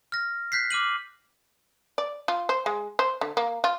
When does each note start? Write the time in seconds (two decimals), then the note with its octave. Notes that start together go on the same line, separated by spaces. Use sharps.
0.12 F6 A#6
0.52 F#6 G6 B6 C7
0.70 D6 F6 D#7 F#7
1.98 D5
2.28 F4
2.49 C5
2.66 G#3
2.99 C5
3.21 D3
3.37 A#3
3.64 F4